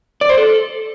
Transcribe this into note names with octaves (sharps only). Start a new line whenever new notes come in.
D5
C5
A4